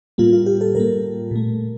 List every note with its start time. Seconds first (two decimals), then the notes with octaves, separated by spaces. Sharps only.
0.18 A2 G3 A#3 F4
0.33 F4
0.46 G4
0.61 A4
0.75 A2 G3 A#3 A#4
1.31 A#2 A3